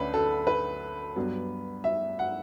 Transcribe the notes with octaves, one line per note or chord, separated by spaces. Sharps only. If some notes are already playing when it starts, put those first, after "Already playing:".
Already playing: D2 D3 A3 C#4 B4
A4
B4
G2 F#3 B3
E5
F#5